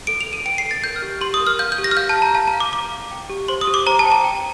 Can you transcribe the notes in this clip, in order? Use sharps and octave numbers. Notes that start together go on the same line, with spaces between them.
A4 D7
F7
A4
D#7
G5 D7
C7
A4
A6
A#4 G6
F6
G4
G4 C6
D#6
A#4
F6
F5 G6
G6
G4
A#6
F6
F5 G6
A5
G4
A#5
F5 A5
A#5
F5
D6
F5 D6
F5
G5
G4
C5 C6
D#6
G4
D6
C5 A#5
A5
G5
A#5
G5